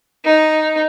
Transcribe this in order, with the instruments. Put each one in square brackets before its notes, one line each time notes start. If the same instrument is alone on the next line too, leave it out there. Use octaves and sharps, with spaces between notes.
[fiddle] D#4